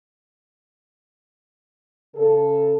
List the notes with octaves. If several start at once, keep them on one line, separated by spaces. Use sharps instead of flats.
C#3 A4